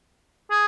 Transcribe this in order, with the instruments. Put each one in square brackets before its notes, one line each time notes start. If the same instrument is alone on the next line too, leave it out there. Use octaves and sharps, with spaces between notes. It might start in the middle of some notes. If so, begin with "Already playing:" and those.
[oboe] G#4